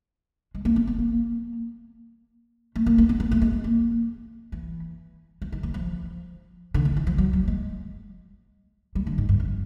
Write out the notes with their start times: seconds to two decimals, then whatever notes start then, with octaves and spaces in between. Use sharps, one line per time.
0.55 G#3
0.65 A#3
0.76 B3
0.87 B3
0.99 A#3
2.76 A3
2.86 A#3
2.98 A#3
3.09 B3
3.20 B3
3.31 A3
3.42 G#3
3.64 A#3
4.52 E3
5.42 F3
5.52 D#3
5.63 E3
5.74 F3
6.74 D3
6.85 D#3
6.97 E3
7.07 F3
7.18 F#3
7.33 F#3
7.48 G#3
8.95 G3
9.07 D3
9.18 G#2
9.29 G2
9.40 F2